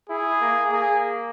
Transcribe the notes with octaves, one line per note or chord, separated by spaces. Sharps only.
E4 G#4
A#3
A#3 G#4